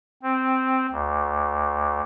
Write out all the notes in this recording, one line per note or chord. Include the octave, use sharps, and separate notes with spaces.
C4
D2